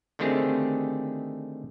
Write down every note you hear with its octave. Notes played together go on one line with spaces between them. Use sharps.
D3 D#3 A3 C4 G4 G#4